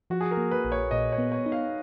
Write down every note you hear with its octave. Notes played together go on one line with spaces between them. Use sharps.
F3 F#4
G#4
A#4
A#3
B4
A#1
C#5
A#2 D#5
C#5
B3
C#5
D#4
F5